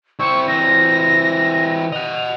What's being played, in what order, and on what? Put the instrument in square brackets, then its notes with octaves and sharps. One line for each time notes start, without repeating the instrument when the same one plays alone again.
[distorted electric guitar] C4 E4 [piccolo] C#6
[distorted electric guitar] E3 C4 [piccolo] A#6
[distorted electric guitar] D#5 F#5 [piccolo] F7